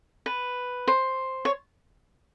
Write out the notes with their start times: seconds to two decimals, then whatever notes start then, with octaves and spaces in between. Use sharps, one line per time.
0.26 B4
0.88 C5
1.45 C#5